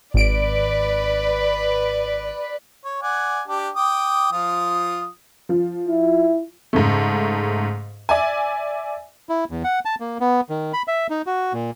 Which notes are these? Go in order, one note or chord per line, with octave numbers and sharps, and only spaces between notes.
G#1 B4 D5 D7
C#5
D5 F#5 G#5
D4 G4
G5 D6 D#6
F3 F4 D#6
F3
E4
G#2 C#3 A3
D5 E5 G#5
E4
E2
F#5
A5
A#3
B3
D#3
B5
E5
D#4
F#4
A#2